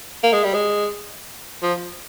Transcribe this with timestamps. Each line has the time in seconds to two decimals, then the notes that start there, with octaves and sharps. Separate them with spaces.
0.23 A#3
0.33 G#3
0.44 G3
0.54 G#3
1.62 F3